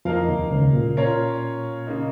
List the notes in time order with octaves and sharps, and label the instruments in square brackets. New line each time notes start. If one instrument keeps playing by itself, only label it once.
[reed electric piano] F2 F3 [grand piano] A#3 D#4 A#4 F5
[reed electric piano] D#2 D#3
C#2 C#3
A#2
[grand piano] C#4 F4 A#4 C#5 F5
C#3 A#3 D#4